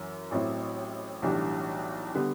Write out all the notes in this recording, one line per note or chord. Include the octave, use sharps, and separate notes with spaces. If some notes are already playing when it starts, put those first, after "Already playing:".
Already playing: F#2 E3
A1 A2 F#3 C4 E4
B1 A2 E3 G3 D4
D3 G3 B3